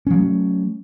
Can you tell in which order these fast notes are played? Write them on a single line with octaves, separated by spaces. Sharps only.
C#4 F3 F#3 A3